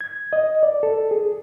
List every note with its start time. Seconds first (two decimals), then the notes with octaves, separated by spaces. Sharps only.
0.01 G#6
0.33 D#5
0.63 D5
0.83 A4
1.11 G#4